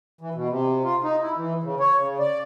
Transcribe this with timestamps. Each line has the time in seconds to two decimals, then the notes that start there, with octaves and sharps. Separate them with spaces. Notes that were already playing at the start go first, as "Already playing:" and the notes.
0.21 E3
0.34 B2
0.49 C3
0.84 F4
1.03 D#4
1.22 E4
1.37 E3
1.63 C#3
1.80 C#5
1.98 C#3
2.19 D5